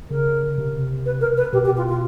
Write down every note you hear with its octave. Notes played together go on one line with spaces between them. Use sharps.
C#3 A#4
C3
B4
A#4
B4
B2 G4
G4
F4
F4